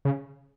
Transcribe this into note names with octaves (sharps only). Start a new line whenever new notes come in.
C#3